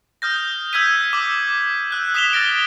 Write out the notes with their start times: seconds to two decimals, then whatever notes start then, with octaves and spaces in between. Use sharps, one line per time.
0.22 D#6 F6 G6 A#6
0.73 E6 G6 G#6 B6 D#7
1.13 D6 E6
1.91 E6 F#6 G6
2.14 D#6 B6 E7 F7 G7
2.33 F6 A6 A#6 D7